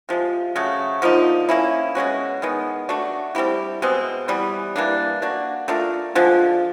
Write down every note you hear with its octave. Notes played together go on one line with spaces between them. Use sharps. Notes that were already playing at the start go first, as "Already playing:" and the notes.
C3 F3 G#3
C#3 F#3 A3
D3 F3 A#3 D#4
A#3 C#4 E4
B2 G#3 C#4 F#4
D#3 G#3 B3
A3 D4 F#4
G3 C4 E4 G4
B2 G#3 C4
E3 G3 B3
E3 G3 A#3 D4
A#3 D4 F#4
A3 D4 F4 A#4
D3 F3 G#3